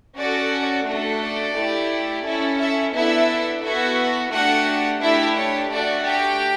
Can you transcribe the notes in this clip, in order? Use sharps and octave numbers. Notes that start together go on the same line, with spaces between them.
C#4 F#4 A4 D5
A3 D4 F#4 A4
D5
A3 E4 G4
C#4 E4 A4
E4 E5
B3 D4 E4 A4 E5
B3 E4 F#4 A4 E5
A3 D4 F#4 G4 F#5
A3 D4 E4 G4 E5
C#5
A3 D4 F#4 A4 D5
G4 G5